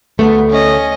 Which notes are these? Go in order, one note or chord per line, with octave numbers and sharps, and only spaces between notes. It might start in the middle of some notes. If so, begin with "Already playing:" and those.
D2 A3 B3
C#4 D#5